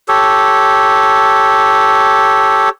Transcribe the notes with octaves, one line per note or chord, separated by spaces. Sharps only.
G4 A4 C#5